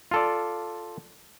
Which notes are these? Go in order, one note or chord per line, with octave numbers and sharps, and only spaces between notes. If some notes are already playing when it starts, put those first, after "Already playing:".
F4 A4 D5